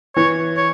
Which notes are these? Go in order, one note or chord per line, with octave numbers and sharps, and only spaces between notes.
E3 C#5
C#5